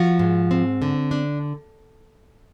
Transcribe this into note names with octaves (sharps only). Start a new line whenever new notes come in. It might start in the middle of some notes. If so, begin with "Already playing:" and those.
Already playing: F3 F#4
G#2
C4
D3
D4